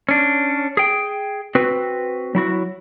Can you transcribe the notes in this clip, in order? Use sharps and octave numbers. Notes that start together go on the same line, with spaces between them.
C#4 D4
G#4 G5
C4 F#4 B4
F#3 E4 F#4